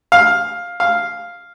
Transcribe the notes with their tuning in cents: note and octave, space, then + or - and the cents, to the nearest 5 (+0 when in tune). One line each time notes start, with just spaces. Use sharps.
F5 +10
F5 +0